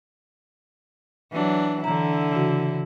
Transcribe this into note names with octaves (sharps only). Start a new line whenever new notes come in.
E3 F#3 D4
D3 E3 E4 A#5
C#3 E3 F#4